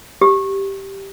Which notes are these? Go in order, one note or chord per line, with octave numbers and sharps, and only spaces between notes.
G4